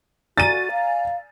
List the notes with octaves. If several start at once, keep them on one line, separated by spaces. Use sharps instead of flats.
F#4 D5 G#5 A#5 A6 D#7
F5